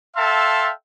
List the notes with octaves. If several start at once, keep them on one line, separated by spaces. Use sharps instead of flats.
A4 E5 F5 G5 A5 C6